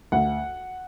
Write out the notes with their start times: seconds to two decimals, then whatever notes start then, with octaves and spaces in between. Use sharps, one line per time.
0.12 D2 F#5